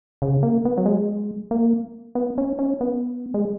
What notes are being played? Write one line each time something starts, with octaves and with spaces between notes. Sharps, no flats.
C#3
A#3
B3
F#3
G#3
A#3
B3
C#4
C#4
B3
G#3